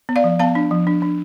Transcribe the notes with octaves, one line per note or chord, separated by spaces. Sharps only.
B3
D5 F5
F3
B3 F5 A5
D4
F3
D4
D4